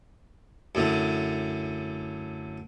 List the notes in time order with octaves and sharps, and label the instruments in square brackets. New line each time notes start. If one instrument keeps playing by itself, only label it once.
[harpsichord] F#2 A2 D3